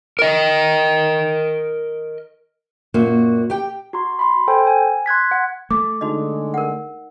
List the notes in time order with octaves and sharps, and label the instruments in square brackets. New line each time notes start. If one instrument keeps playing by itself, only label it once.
[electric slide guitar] A#4 D#5
[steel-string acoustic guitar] F#2 A#2 A#3 F#4
G4 G5
[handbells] F#4 A#5 C6
B5 C6
A4 C5 G5 G#5
G#5
C6 F#6 G#6 B6
F#5
[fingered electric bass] A3 [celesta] D6
[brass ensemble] D3 G#3 [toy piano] D#4 F#4 D#5
[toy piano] A#4 F#5